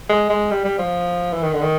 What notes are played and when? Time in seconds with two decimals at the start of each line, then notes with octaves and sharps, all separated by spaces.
0.09 G#3
0.30 G#3
0.51 G3
0.65 G3
0.78 F3
1.33 E3
1.43 D#3
1.53 D3
1.62 D#3